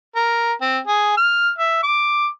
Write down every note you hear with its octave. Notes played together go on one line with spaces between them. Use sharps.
A#4
C4
G#4
F6
E5
D6